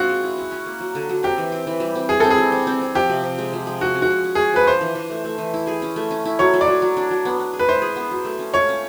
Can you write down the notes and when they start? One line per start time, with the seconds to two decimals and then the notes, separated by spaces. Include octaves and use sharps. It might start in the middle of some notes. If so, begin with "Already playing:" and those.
Already playing: A#3 C4 F4 F#4
0.09 G#3
0.24 E4
0.37 C#4
0.52 C#4
0.66 A#3
0.80 F#3
0.95 D3
1.09 F#3
1.23 C4 G4
1.38 E3
1.52 C4
1.67 E3
1.80 G3
1.95 C4
2.09 G3 G#4
2.20 C4 A4
2.30 G#4
2.38 G3
2.52 C4
2.67 C4
2.81 C4
2.95 F3 G4
3.10 C3
3.23 C3
3.38 G#3
3.53 F3
3.67 G#3
3.81 G#3 F#4
3.95 C#4
4.02 F#4
4.10 C#4
4.24 C#4
4.35 G#4
4.39 C#4
4.53 F3 B4
4.67 D4 C5
4.81 E3
4.95 E3
5.10 A3
5.24 A3
5.38 E3
5.54 E4
5.67 G#4
5.82 C#4
5.96 A3
6.11 C#4
6.25 E4
6.39 F#3 C#5
6.54 F#3
6.61 D5
6.67 F#3
6.82 F#3
6.97 D4
7.11 F#3
7.25 B3
7.39 B3
7.53 G#4
7.59 B4
7.68 E4 C5
7.82 G#4
7.96 B3
8.11 F#3
8.25 A3
8.39 C#4
8.54 F4 C#5
8.69 C#4